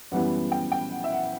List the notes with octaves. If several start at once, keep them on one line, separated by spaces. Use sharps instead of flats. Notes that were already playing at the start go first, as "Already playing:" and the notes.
F#2 E3 G3 B3 F#5
G5
G5
F#5
E5
F#5